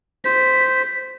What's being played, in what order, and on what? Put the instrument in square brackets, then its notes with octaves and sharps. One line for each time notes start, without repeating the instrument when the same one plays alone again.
[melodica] C5 [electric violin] B6